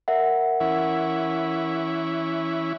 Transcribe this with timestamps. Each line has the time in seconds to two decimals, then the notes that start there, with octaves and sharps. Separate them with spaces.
0.08 A#4 E5 F#5
0.60 E3 C#4 E4